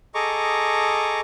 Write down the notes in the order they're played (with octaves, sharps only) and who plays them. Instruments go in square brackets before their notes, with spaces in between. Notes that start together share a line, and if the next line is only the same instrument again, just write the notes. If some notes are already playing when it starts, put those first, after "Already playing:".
[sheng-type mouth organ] G#4 A4 D#5 A#5 C#6 D6